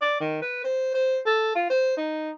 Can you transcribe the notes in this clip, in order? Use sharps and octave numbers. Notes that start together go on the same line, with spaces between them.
D5
D#3
B4
C5
C5
A4
F4
C5
D#4